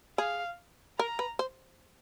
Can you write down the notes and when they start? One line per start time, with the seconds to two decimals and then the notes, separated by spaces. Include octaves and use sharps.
0.18 G#4 F5
0.99 A#4 A#5
1.19 B4
1.39 C5